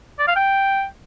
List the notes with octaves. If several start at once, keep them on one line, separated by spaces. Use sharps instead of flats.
D5
F5
G5